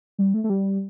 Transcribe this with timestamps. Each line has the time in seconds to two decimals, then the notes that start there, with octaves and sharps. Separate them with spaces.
0.18 G3
0.34 A3
0.44 A3
0.50 G3